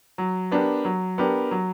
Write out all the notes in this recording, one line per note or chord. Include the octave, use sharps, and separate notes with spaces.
F#3
B3 D4 G4 A#4
F#3
B3 D4 G4 A#4
F#3